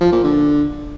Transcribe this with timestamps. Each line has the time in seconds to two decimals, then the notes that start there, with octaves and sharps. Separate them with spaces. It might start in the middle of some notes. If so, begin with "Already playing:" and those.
0.01 F3
0.12 A#2
0.24 D3